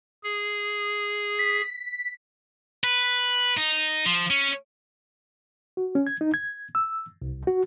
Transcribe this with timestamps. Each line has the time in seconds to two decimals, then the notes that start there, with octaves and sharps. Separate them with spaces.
0.23 G#4
1.39 B6
2.84 B4
3.57 D#4
4.06 F3
4.30 C#4
5.77 F#4
5.95 C#4
6.07 G#6
6.21 D#4
6.34 G#6
6.75 E6
7.22 C2
7.47 F#4